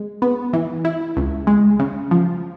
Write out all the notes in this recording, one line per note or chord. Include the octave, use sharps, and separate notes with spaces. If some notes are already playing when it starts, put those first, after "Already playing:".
Already playing: G#3
B3
E3
E4
C#2
G#3
C#3
F3